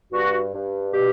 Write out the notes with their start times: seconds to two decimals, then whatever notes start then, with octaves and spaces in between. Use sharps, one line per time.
0.12 G2 F#4
0.52 G2
0.92 B2 G4